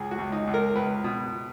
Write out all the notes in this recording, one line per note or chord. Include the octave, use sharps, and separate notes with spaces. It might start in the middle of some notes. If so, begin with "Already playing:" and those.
Already playing: C#2 G#4
F#4
C#2
D#4
C#2
A#4
C#2 B4
B2